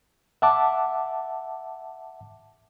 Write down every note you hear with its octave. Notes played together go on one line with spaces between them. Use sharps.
E5 F#5 A5 D6